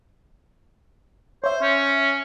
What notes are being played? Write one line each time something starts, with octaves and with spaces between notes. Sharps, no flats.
C5 C#5 E5
C#4